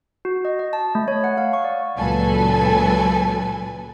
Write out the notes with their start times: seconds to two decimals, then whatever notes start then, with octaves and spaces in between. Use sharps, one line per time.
0.25 F#4
0.45 D#5
0.59 D#5
0.73 A5
0.95 A3
1.08 C#5
1.24 F#5
1.38 F5
1.53 C#6
1.64 D5
1.97 C#2 A#2 F#3 A4 B4 G#5